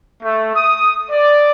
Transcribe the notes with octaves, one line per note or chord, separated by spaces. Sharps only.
A3
D#6
D5